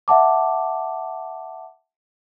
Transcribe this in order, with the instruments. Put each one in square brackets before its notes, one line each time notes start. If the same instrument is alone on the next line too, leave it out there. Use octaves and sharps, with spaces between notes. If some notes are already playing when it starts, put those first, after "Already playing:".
[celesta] E5 F#5 A5 D6